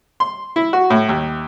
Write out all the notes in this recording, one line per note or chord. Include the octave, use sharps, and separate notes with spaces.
C6
E4
F#4
A2
D#2